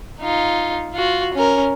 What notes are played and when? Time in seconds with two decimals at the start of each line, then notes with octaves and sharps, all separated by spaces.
0.20 D#4 F4
0.94 F4 F#4
1.34 C#4 A#4